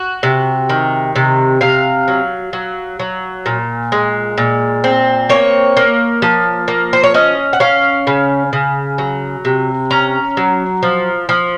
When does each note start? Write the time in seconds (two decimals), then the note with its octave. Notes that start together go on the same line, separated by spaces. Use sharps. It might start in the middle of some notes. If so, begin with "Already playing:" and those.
Already playing: F#4
0.23 C3
0.69 D#3
1.16 C3
1.61 C3 F5
2.08 F#3
2.53 F#3
2.99 F#3
3.46 A#2
3.92 G#3
4.38 A#2
4.84 C4
5.29 A#3 C#5
5.77 A#3
6.22 F3
6.68 A#3
6.93 C5
7.04 C#5
7.14 C#4 D#5
7.53 F#5
7.60 C#4 F5
8.07 C#3
8.53 C#3
8.98 F#3
9.45 C3
9.91 C#4 A#5
10.37 F#3
10.83 F3
11.29 F3